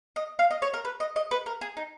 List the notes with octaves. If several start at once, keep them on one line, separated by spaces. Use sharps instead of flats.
D#5
F5
D#5
C#5
A#4
B4
D#5
D#5
B4
A#4
G#4
D#4